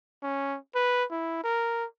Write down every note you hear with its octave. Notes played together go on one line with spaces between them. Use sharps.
C#4
B4
E4
A#4